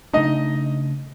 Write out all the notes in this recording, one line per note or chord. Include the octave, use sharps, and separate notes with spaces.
C#3 A3 D4 D#4 D#5